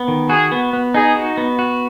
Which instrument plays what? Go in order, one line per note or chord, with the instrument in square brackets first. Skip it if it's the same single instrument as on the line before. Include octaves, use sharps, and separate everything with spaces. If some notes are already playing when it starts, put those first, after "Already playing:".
Already playing: [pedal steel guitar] B3
D#3
[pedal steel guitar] F#4 [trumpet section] G#4
[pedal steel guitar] B3
B3
[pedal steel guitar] D#4 [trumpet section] G#4
[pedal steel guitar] F#4
B3
F#4